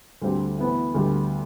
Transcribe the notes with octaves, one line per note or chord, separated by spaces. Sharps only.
D2 D3 G3 C4 G4
A2 E3 B3
D2 D3 G3 B3